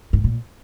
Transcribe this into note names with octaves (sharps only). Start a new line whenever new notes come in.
G#2
A#2